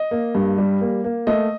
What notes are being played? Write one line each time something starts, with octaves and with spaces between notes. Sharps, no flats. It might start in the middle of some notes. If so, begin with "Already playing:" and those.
Already playing: D#5
A#3
G2
G3
A#3
A#3
A3 D#5